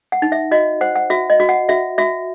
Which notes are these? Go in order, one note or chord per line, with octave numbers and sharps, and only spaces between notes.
F#5
D#4
E5
F#4 D#5
C5 F#5
F#5
F#4 E5
D#5
F#4
F#5
F#4 E5
F#4 E5